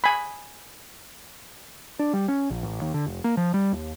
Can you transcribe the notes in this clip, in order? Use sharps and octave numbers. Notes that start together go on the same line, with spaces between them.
G#5 B5
D4
G3
C#4
A#1
A1
D#2
D3
F1
A#3
F3
G3
D#2